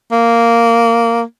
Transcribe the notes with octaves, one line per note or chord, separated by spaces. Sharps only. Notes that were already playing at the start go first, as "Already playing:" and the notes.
A#3